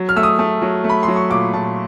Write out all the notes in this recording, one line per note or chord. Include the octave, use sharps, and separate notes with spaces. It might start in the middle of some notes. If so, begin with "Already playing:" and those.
Already playing: F#3
F6
A3 E6
D#6
A3
F#3
A3
B5
F#3 C6
C#6
A#2 D6
A#2 A5